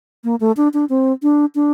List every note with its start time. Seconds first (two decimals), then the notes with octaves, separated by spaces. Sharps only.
0.24 A#3
0.40 A3
0.57 D4
0.74 D4
0.89 C4
1.23 D4
1.55 D4